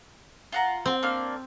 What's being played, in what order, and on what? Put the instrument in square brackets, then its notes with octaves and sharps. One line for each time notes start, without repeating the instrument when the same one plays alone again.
[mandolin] F4 F#5 A#5
[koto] C4
[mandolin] A#3 D4 F6